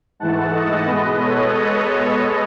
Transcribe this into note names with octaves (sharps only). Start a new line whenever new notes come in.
G#2 E3 A3 F#5 A5
D#5 F#5
B2 G#3 B3 B4 D#5
A4 C#5